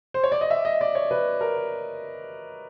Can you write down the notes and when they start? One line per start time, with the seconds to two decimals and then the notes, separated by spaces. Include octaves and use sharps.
0.14 C5
0.24 C#5
0.32 D5
0.41 D#5
0.50 E5
0.65 D#5
0.81 D5
0.95 C#5
1.11 B4
1.41 A#4